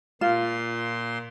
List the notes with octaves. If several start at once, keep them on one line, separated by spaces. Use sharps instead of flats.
A#2 F4 C6